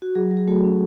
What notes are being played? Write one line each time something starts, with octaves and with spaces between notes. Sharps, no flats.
F#4
F#3 G#4
F#3
G#4
A3 F#4 A4
C#4